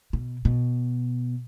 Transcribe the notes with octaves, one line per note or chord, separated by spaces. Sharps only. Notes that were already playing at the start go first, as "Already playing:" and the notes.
B2
B2